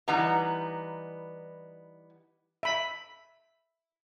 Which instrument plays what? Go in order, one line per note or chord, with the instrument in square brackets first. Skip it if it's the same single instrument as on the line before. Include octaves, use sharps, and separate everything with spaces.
[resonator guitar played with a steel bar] E3 G3 B3 D#4 A#5
[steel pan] E5 B5